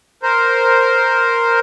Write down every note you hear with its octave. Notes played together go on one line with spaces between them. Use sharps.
A#4 C5